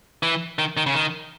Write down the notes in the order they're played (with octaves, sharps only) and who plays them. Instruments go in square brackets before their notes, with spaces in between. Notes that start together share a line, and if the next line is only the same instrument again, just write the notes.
[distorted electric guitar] E3
D#3
D#3
C#3
D#3